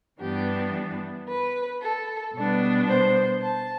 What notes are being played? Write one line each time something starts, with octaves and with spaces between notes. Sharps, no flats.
G2 E3 G3 B3 D4 G4
B4
A4
B2 G3 B3 D4
C5
A5